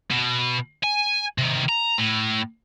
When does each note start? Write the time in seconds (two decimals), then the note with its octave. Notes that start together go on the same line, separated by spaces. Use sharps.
0.10 B2
0.83 G#5
1.38 C3 D#3
1.69 A#5
1.98 A2